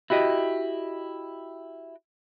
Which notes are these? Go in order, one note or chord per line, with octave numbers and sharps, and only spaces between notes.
E4 F#4 G4 D#5